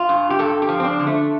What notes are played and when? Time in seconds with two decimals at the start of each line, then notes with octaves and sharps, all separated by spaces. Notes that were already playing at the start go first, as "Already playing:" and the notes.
Already playing: F4
0.09 G2
0.30 G4
0.39 G2 A4
0.62 G4
0.69 F3
0.80 C4
0.84 D4
0.99 D3
1.07 A3